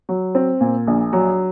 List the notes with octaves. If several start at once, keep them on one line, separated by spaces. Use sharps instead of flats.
F#3
C4
A#2
A#1
F#3